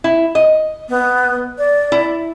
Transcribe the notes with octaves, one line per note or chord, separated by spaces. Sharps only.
E4
D#5
B3
D5
E4